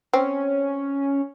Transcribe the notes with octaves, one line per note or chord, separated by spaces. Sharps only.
C4 C#4